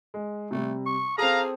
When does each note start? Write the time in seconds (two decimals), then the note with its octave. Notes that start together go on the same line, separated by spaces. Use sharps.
0.14 G#3
0.51 C3 G3 A3
0.86 C#6
1.18 C4 G#4 A4 F5 A#5